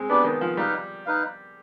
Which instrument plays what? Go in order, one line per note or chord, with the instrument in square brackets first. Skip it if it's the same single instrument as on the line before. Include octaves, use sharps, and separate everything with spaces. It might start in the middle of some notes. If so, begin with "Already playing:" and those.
Already playing: [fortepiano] G#3 C4
[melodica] G3 D4 G4 D5 [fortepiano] B3
[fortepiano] D#3
F3
[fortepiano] G3 [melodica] D#4 B4 F5
[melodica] D#4 B4 F5